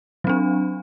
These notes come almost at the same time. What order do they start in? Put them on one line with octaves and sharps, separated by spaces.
F#3 C4 D4